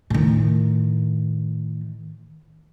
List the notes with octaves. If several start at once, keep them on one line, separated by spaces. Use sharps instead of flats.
A2 D#3